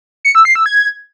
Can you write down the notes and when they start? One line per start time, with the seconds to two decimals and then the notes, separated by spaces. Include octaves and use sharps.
0.25 C#7
0.35 E6
0.45 C7
0.55 E6
0.66 G#6